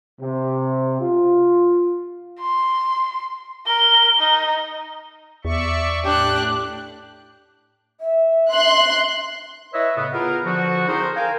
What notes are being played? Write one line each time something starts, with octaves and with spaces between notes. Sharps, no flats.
C3
F4
C6
A#4 G7
D#4
E2 D5 E5 C#6
A2 D4 G4 F#6
E5
C6 F#6
E4 B4 C#5 D#5 E5
A2 C#3 B3
B3 E4 F4 G#4 A#4
D3 F3 F#4
C4 D#4 E4 G#4 A#4 C5
A#4 F5 G5 G#5